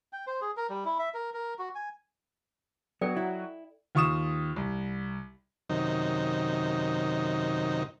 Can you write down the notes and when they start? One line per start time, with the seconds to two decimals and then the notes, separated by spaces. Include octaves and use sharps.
0.13 G5
0.27 C5
0.41 G#4
0.57 A#4
0.69 G3
0.85 E4
0.99 E5
1.14 A#4
1.34 A#4
1.59 F#4
1.75 G#5
3.01 F#3 B3 A4 D5 G5
3.17 E4
3.95 D#2 F4 C#6 D#6 E7
4.56 C2
5.70 F#2 C3 D#3 D#4